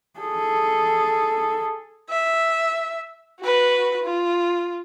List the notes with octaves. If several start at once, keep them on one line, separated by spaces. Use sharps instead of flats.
G#4 A4
E5
F#4 B4
F4